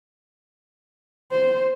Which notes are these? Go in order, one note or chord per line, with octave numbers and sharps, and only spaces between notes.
C5